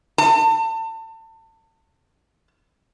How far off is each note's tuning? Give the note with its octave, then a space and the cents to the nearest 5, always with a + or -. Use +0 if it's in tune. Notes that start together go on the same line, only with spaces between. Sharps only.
A5 +30